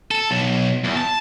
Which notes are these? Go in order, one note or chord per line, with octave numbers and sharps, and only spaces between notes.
A4
B1
E2
A5